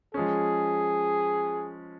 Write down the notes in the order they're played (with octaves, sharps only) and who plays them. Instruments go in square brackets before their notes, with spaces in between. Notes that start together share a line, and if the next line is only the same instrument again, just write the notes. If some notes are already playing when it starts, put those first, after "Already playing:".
[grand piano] F3 G#3 C#4 [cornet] G#4